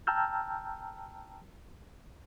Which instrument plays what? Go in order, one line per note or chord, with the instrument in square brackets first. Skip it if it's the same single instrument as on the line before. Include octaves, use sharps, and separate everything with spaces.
[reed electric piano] G5 A5 A#5 E6 F6 G6